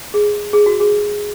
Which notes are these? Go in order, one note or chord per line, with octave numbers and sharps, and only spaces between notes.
G#4
G#4
F#4
G#4